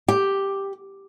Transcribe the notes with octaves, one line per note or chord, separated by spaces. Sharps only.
G4